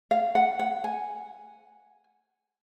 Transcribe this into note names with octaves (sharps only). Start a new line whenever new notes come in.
F5
F#5
F#5
G#5